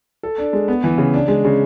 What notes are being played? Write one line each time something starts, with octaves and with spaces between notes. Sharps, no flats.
A4
D4
G#3
B3
E3
C#3
D4
G#3
C#3